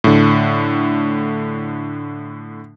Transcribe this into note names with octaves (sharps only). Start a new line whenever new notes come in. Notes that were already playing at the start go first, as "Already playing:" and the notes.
A2 D3